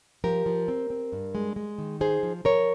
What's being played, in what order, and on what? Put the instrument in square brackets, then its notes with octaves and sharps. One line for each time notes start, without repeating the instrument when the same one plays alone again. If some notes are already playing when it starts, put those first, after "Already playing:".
[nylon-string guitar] F3 G4 A#4
F3
C4
C4
G2
G#3
G#3
D#3
D#4 G#4 C5
F3
F3 A#4 C#5